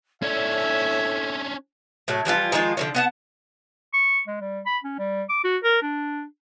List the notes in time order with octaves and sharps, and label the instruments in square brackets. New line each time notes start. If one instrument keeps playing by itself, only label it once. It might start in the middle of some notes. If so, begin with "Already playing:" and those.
[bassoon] A2 [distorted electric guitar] C#4 D4 [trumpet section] E5 [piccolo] G#6
[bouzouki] A2 F#3 A3
E3 F3 G3 F4
D#3 F3 G#3 F4
D3 F3 C#4
B3 F#5 A5
[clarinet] C#6
G#3
G3
B5
C#4
G3
D6
F#4
A#4
D4